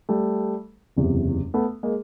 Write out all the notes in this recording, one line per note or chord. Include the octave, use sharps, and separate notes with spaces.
G3 A3
F#1 E2 C3
A3 B3
G#3 A#3